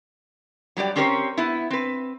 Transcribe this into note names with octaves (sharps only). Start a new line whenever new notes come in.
F#3 G3 G4 D5
C4 C#4 G4 A#4 C5 C#5
B3 E4
C4 B4